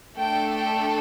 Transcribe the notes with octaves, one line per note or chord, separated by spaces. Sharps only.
A3 D4 A4 G5
G5